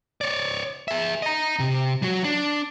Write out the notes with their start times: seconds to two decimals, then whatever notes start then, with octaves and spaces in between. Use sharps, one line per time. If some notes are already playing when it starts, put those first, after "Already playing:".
0.21 C#5 D5
0.88 G#4 E5
1.22 D#5 A#5
1.59 C3
2.02 F#3 F#4
2.24 D4